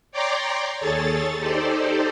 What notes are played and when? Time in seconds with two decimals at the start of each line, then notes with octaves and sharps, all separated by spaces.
0.12 C#5 D5 G5 A#5 C6 D6
0.78 D#2 G#4 A4 C#5 A6
1.37 D#4 G4 A4 C5 D5